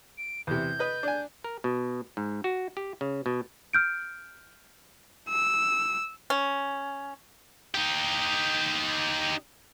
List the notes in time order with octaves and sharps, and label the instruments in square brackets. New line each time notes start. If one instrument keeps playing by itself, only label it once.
[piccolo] D7
[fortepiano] E2 C3 [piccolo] G6
[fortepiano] B4 D#5
D4 G#5
[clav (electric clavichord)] A#4
B2
G#2
F#4
G4
C#3
B2
[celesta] F6 G6 D7
[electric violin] E6
[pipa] C#4
[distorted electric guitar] D#4 G4